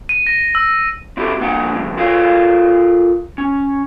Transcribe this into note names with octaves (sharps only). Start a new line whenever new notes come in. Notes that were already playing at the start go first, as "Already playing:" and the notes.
D#7
A#6
E6
C4 E4 F#4 G4 A4
F2 A#3 D4 F#5
F2 A2 C#3
F4 A4 A#4 C#5 F5
C#4